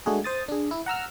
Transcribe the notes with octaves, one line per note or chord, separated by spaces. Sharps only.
G#3 A3 D4 F#4 G#4
C5 D#6 A6
D4 G#4
E4
F#5 A#5 E6 F6